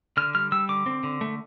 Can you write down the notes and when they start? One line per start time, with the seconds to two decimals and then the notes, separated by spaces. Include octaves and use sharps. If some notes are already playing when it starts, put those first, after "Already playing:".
0.17 D3 F6
0.35 G3 F6
0.52 G3 E6
0.69 D3 D6
0.86 C4
1.04 D3
1.21 A3